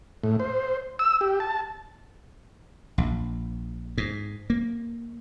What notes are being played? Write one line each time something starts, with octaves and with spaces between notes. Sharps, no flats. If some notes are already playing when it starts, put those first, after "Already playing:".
A2
C5
E6
G4
A5
A#1
G#2
A#3